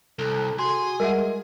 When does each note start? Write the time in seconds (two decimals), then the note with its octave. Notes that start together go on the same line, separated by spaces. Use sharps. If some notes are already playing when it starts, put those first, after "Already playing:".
0.19 C2 A4
0.59 F#4 G#4 C6
1.00 G3 G#3 A#4 E5 F#5